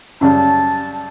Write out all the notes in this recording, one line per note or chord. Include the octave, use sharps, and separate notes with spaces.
F#2 C#3 G3 A5